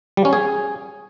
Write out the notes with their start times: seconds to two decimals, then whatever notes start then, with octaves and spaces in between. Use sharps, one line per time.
0.17 G3
0.25 C#4
0.33 G#4